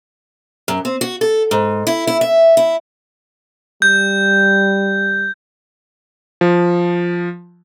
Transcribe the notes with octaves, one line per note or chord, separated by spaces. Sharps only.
F#2
C4
F#4
A4
G#2
E4
E4
E5
E4
G3 G6
F3